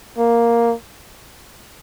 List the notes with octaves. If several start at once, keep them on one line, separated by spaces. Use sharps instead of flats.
A#3